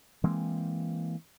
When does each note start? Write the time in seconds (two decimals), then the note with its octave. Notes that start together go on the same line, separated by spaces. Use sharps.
0.24 E3 G#3 A#3 C4